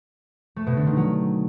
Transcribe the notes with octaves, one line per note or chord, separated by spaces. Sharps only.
A3
B2
D3
D#3
F#3